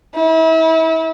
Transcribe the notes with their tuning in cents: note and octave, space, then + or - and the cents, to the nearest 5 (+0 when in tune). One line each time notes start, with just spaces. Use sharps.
E4 -35